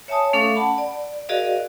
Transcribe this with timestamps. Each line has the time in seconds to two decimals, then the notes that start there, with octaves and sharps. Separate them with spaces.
0.08 C#5 E5 G#5 A5 D#6
0.33 A3 C#4 A4 E5 F5 D6
0.56 F#5 A5 B5
0.78 D5
1.29 F#4 G#4 A#4 D5 D#5 F5